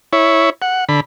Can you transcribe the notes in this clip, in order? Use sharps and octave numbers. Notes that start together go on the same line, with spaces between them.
E4 C#5
F#5
D3 B5